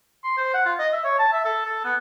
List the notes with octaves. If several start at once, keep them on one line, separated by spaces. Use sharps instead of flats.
C6
C5
F#5
F4
D#5
E5
C#5
A5
E5
A4
A4
B3